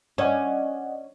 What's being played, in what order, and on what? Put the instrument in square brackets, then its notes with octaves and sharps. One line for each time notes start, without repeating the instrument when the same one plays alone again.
[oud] C#4 [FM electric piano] D5 D#5 F#5